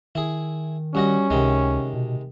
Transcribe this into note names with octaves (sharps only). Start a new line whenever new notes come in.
D#3 E4 G#4
G2 C#4 F#4 D#5
C#2 C3 D#3 G#3
B2